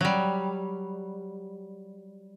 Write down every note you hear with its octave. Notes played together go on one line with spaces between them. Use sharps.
F#3 G3